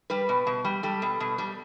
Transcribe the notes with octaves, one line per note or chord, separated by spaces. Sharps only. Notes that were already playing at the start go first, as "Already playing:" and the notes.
G3 B4
B2
B2
G3
G3 A4
B2
B2
G3